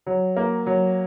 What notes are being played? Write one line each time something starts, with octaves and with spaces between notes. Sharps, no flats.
F#3
A#3
F#3